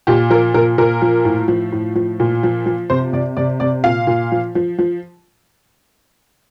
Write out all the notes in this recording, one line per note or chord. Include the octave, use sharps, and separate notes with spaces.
A#2 G4
F3 A#4
A#2 A#4
A#2 A#4
F3
A2
F3
A2
F3
A#2
F3
F3
C3 C5
C3 D5
C3 D5
C3 D5
A#2 F5
A#2
F3
F3
F3